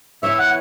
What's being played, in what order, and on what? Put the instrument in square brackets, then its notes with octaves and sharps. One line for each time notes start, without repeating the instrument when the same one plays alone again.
[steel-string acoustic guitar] E3 B3 E4 C#5 [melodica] E5
[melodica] F#5